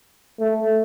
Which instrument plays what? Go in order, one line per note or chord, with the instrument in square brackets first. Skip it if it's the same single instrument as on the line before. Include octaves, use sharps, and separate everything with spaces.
[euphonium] A3